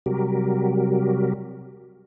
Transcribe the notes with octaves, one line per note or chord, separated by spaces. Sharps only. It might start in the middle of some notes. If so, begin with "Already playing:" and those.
C3 F#3 G3 F#4 G4 A#4